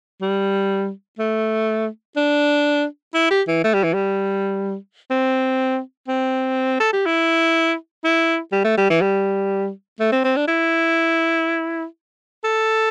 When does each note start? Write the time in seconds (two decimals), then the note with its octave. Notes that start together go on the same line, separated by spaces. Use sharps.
0.22 G3
1.19 A3
2.16 D4
3.14 E4
3.30 G4
3.47 E3
3.64 A3
3.74 G3
3.84 E3
3.94 G3
5.10 C4
6.08 C4
6.80 A4
6.93 G4
7.06 E4
8.04 E4
8.52 G3
8.64 A3
8.78 G3
8.90 E3
9.01 G3
10.00 A3
10.12 C4
10.24 C4
10.36 D4
10.48 E4
12.44 A4